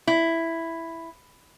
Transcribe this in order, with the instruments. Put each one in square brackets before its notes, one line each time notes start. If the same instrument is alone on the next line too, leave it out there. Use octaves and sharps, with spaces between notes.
[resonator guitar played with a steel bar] E4